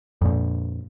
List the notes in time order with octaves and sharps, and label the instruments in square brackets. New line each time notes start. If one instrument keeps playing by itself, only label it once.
[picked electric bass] F2 A#2